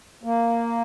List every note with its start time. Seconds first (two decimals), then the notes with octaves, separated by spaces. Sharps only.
0.24 A#3